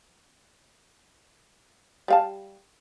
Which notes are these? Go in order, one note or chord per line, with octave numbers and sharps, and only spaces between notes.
G3 F5 A5